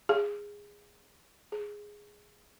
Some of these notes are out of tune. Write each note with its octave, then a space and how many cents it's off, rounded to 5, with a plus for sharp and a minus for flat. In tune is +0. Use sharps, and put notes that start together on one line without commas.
G#4 -15
G#4 -5